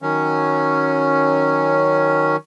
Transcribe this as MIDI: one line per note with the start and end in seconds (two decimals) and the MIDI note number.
0.02 2.36 51
0.02 2.36 54
0.02 2.36 61